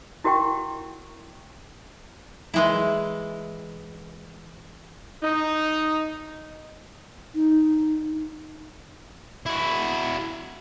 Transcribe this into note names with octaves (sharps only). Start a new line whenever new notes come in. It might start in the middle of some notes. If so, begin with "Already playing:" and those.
E4 F#4 A#4 F#5 G5 C#6
E3 G#3 E4
D#4
D#4
E4 F#4